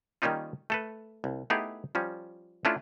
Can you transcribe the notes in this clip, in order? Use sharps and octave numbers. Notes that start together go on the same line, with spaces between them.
D#3 G3 A#3 C#4 D#4 F4
A3 A4 B4
C2
A3 B3 D#4 E4 G4 G#4
F3 G3 C#4
A3 C#4 D4 E4 F4